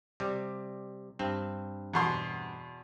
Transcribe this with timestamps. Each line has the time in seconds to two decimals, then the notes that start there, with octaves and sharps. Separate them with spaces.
0.20 C3 G3
1.19 G2 C4
1.94 E2 B2 C6